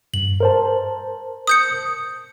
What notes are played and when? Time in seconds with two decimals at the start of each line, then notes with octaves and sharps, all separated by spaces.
0.14 G2 F#7
0.40 A#4 C5 A5
1.47 D#6 G6 C#7